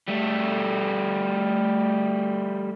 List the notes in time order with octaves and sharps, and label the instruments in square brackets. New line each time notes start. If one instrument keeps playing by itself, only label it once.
[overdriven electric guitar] G3 A3